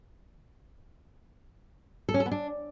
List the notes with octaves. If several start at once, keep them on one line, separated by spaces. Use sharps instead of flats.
A4
C#4
A4
B3
D4